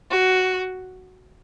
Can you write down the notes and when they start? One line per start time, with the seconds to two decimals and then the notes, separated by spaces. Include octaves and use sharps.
0.11 F#4